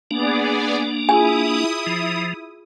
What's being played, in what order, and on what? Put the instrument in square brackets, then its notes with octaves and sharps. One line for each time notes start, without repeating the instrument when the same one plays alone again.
[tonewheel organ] A#3 D4 [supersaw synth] B3 G#4 D5
[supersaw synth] E4 D#6 [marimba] F4 G#4 [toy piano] G#5
[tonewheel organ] F3